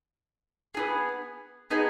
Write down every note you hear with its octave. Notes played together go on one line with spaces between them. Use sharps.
B3 D#4 G#4
B3 D#4 G#4